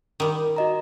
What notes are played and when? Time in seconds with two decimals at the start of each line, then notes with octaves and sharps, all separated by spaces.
0.20 D#3 G3
0.56 F#4 D#5 A#5